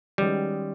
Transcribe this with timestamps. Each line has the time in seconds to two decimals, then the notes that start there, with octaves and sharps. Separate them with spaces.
0.18 D#3 G3 G#3 C#4 F#4 B4